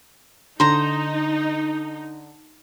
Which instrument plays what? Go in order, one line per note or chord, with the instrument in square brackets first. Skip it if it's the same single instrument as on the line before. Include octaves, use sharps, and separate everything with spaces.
[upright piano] D3 [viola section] D#4 [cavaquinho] C5 A#5